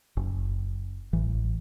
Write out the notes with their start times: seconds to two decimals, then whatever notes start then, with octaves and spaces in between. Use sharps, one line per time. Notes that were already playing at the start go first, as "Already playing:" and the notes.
0.17 F#1
1.13 A1 E3